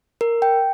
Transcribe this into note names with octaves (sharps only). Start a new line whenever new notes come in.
A#4
G5